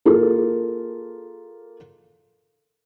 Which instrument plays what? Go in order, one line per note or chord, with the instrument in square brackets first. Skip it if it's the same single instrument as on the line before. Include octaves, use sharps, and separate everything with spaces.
[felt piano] A#3 F4 G#4 A4